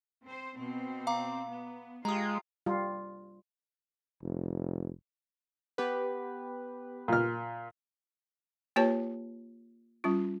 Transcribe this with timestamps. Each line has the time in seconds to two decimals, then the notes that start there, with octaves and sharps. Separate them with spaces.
0.23 C4 C5
0.55 B2 C4
1.07 F5 A#5 D6
1.48 B3
2.05 G#3 F4 G4 A#5 D#6
2.66 G3 F4
4.23 F1
5.78 B3 G4 B4
7.08 A#2 F6
8.76 A#3 F4 G4 B4 C#5 A5
10.04 G3 C#4 F4